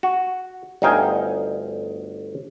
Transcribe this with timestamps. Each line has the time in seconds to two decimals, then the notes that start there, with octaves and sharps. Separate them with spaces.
0.03 F#4
0.82 G1 D2 D#4 F5 G5 G#5